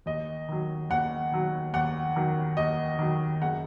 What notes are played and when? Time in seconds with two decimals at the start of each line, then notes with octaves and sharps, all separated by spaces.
0.06 D#2 D#5
0.49 D#3 F#3
0.90 D#2 F#5
1.32 D#3 F#3
1.74 D#2 F#5
2.16 D#3 F#3
2.57 D#2 D#5
2.99 D#3 F#3
3.41 F#1 F#5